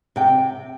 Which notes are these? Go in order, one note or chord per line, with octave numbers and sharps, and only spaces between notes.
C3 G5